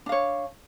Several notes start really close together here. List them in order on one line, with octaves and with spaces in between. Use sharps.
D4 F5 C#5